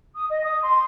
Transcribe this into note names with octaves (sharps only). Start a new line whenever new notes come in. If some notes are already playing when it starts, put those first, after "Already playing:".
D#6
D#5
D#6
C6